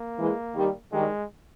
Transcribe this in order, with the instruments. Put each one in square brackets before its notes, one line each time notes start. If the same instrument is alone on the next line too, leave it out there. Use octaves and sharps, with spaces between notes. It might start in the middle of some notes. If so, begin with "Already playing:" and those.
Already playing: [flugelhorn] A#3
[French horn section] E3 G#3
D#3 G3
[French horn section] D#3 G3 [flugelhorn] G#3